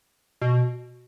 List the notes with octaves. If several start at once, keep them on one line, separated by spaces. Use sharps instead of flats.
B2